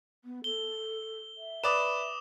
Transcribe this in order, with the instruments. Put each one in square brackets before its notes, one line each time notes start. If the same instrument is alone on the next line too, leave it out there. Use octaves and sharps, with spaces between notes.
[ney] B3
[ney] A4 [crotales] G7
[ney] E5
[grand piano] B4 D5 [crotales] D6 D#6 E7